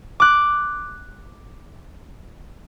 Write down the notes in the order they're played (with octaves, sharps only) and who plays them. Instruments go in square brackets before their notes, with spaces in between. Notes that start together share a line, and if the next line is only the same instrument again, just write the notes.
[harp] D6 F#6